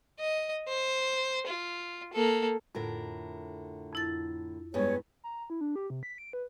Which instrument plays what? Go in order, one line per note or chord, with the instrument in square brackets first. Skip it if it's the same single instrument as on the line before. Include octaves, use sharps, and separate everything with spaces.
[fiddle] D#5
C5
F4
A#3 A4
[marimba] F2 [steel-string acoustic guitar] A2 D3 A#4
[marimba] F2 E4 A6
[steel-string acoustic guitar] G2 G#3 B3 [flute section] C#5
[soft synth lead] A#5
E4
D4
G4
C3
B6
D7
B4